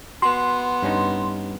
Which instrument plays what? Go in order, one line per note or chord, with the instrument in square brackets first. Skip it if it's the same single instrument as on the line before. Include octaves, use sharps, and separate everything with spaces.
[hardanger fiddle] B3 [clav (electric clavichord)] F#4 [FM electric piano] C6
[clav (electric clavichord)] G2 C#4 D#4